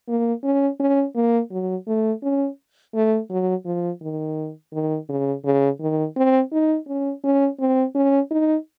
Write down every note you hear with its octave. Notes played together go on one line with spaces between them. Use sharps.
A#3
C#4
C#4
A#3
F#3
A3
C#4
A3
F#3
F3
D#3
D#3
C#3
C#3
D#3
C4
D#4
C#4
C#4
C4
C#4
D#4